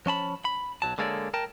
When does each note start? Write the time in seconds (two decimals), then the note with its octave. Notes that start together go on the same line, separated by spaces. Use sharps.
0.06 F3 C#4 A5 B5
0.45 B5
0.82 B1 F#3 A5
0.98 D3 G#3 A#3 A4 C#5 D5
1.34 A#4 G5 A5